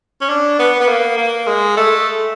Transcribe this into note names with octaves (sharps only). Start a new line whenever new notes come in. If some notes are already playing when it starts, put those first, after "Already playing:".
C#4
D4
B3
B3
A#3
A#3
G#3
A3